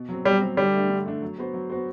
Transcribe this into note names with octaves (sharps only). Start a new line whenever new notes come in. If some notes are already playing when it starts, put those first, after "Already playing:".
Already playing: B2
F#3 C4
B2 G3
F#3 C4
D3 G3
A3 D4
D3
A3 D4
F#3
B3 F#4 C5
F#3
B3 F#4 C5